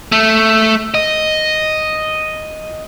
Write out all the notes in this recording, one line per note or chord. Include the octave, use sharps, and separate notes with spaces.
A3
D#5